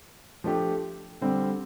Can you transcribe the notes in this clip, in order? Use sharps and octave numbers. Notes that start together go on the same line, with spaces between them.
F3 A3 D4 G4
D3 G3 C4